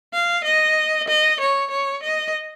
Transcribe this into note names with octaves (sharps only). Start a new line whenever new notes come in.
F5
D#5
D#5
C#5
C#5
D#5